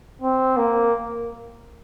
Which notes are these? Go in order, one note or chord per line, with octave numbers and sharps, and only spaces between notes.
C4
A#3